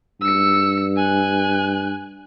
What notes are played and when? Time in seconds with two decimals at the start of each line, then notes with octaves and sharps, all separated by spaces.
0.21 G2 E6 C#7
0.96 G#5 F#6